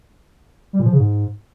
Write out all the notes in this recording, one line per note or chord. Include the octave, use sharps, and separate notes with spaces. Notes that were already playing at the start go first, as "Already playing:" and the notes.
G3
A#2
F3
C#3
G#2